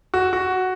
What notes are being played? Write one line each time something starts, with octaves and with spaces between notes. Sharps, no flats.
F#4
F#4